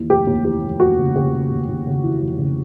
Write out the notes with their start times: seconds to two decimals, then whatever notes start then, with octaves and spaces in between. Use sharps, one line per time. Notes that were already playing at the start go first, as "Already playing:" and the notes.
Already playing: D#2 E3
0.10 F1 G4
0.27 D#2
0.45 E3 G4
0.63 F1
0.80 F1 F#4
0.98 C#3
1.15 C#3 G4
1.33 C#3
1.51 D#2
1.68 D#2
1.87 C#3
2.04 E3
2.22 F1
2.39 C#3